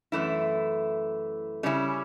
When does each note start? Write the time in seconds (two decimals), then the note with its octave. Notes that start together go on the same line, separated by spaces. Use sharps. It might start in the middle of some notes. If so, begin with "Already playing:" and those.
0.12 F#2 E3 A3 E4
1.63 C#3 G3 C#4 E4